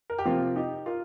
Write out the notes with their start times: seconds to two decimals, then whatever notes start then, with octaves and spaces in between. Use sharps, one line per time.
0.10 A#4
0.19 G4
0.25 C3 F3 A#3 C4 F4
0.56 D#4 G4
0.86 F4 A#4